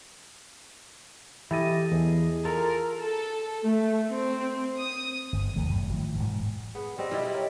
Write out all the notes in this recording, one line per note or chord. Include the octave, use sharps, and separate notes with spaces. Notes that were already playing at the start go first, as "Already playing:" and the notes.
E3 E4 G4 A4 D#5
E2 G#4
F4 A4 A#4
A4
A3
C4
D#6
G1
A#1 D#2 D#3 A3
G1 F#2 A2 F#3
A2 D#3 F3 F#3
E1 G#2
B3 G#4
G3 C4 D#5
B2 G3 E4
A#4 C#5